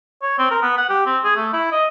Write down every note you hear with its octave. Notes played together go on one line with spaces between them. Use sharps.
C#5
C4
A#4
B3
F#5
G4
C4
G#4
A3
E4
D#5